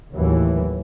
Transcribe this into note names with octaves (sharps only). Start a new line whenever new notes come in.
D#2 A2 E3 F#3